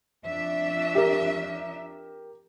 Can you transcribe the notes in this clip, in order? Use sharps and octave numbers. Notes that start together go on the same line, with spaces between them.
F2 D4 E5
G4 A#4